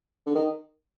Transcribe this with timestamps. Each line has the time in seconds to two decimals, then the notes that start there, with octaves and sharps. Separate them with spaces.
0.26 D3
0.35 D#3